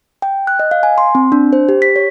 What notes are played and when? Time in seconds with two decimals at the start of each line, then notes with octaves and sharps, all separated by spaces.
0.22 G5
0.47 F#6
0.59 D#5
0.71 F5
0.83 G#5
0.98 C6
1.15 C4
1.32 D4
1.53 C5
1.69 G4
1.82 B6
1.96 C#5